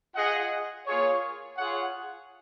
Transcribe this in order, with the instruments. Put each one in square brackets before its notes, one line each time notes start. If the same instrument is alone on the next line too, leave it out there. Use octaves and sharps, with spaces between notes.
[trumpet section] F4 G#4 D#5 F#5
A#3 F4 G#4 C#5
F4 G#4 C#5 F#5